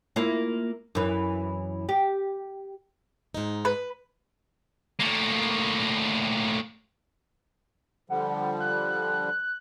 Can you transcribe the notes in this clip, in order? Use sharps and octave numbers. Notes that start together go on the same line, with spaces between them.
A#3 E4 F4
F#2 E3
G4
G#2 D#4
B4
A2 A#3
D3 F3 G3 F#5
F#6